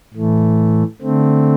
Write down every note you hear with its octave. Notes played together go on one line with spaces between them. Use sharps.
A2 E3 A3
D3 A3 C4